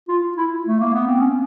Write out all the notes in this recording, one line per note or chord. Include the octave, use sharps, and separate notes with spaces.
F4
E4
A3
A#3
B3
C4
C#4